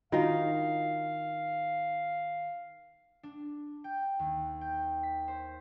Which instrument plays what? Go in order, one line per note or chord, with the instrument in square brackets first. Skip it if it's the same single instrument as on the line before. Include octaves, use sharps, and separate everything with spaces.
[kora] D#3 D#4 [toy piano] D4 F4 F#4 [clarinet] F5
[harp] D4
G5
D#2
G5
B6
C5